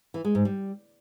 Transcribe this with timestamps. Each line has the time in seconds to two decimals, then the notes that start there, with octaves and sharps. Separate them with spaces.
0.14 E3
0.25 G#3
0.35 G#2
0.45 G3